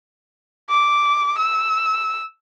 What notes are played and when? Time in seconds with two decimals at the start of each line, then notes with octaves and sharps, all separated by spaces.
0.70 D6
1.38 E6